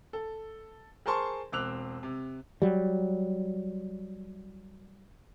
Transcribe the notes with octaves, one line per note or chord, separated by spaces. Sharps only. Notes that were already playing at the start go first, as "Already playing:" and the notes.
A4
G#4 A#4 C5 A5 C6 C#6
E1 C4 D6 E6 F#6 F7
C3
F#3 G3